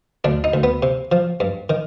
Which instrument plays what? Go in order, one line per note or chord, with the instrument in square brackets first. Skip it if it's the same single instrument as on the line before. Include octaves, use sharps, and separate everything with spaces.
[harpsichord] D2 D4
D#4
D2
B3
C3
F3
G2
D#3